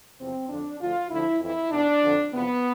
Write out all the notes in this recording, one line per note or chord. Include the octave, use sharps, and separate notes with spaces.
E2 C3 F3 C4
F2 D3 F3 D4
D2 D3 F3 F4
D2 D3 F3 E4
F2 E3 E4
E2 B2 D4
F2 D3 F3
E2 C3 F3 B3